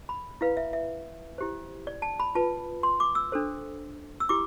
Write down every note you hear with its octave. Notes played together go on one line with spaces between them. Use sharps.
B5
E4 B4 F5
E5
E5
E4 G4 C5
D5
A5
B5
F4 B4 A5
C6
D6
E6
D4 A4 C5
E6
E4 G4 D6